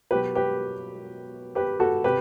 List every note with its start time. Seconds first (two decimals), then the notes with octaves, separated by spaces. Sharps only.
0.11 B2 G4 B4
0.14 F#3
0.35 G4 B4
1.55 G4 B4
1.80 F#4 A4
2.04 C3 G4 B4